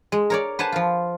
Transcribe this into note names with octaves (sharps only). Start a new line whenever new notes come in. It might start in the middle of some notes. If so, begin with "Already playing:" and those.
G#3
A#4 C#5 D5
B4 C5 F#5 G#5 A5
F3 F4